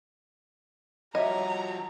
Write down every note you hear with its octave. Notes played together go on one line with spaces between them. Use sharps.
F3 F#4 G4 C#5 D#5 E5 A#5